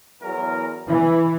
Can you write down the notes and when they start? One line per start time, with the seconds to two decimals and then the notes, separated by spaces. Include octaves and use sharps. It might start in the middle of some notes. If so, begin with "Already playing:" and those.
0.22 E2 F#3 A#4
0.88 E3 E4